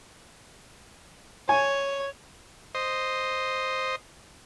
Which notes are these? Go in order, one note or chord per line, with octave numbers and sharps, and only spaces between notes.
C#5 G#5
C5 D#5